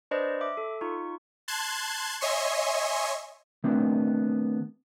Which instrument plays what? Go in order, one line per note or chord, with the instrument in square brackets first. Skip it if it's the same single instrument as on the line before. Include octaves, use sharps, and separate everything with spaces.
[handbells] D4 B4 C5 D5 D#5
E5 D6
A4
D#4 F4 C#6
[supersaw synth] A5 C6 F#6 G#6
C#5 D#5 E5 G#5 C6 C#6
[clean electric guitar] D#3 A3 B3 C4 D4